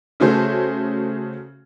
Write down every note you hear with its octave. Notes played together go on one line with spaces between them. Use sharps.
C#3 A3 F#4 G#4 C5